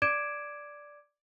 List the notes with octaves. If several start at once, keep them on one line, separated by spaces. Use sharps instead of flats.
D5 D6 G#6 D7 E7